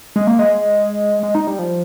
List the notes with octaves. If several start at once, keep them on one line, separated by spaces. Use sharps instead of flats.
G#3
A#3
G#3
G#3
D#4
G3
F3